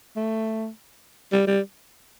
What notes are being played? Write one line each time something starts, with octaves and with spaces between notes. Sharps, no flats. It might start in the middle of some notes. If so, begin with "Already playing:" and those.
A3
G3
G3